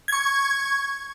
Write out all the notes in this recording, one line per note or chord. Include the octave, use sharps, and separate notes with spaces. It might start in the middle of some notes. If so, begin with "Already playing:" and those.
C#6 G#6